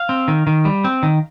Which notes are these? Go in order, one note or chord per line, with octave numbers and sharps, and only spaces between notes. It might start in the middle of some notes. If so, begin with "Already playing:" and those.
Already playing: F5
C4
D#3
D#3
G3
C4
D#3